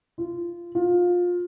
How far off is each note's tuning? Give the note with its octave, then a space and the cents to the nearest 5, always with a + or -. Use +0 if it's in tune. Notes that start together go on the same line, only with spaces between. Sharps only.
F4 -20
F4 +20